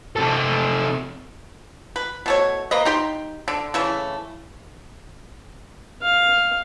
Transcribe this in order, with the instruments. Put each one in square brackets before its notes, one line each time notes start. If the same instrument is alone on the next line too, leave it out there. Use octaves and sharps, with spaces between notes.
[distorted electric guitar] C3 A4
[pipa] B4
B2 A3 C#5
A#3 B4 D#5
D#4 G4 C6
D3
C#3 E3 A3
[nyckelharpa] F5